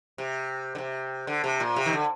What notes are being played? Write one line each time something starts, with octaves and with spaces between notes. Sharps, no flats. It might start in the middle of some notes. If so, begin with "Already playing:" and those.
C3
D3
C3
D3
C3
A#2
C3
D#3
D3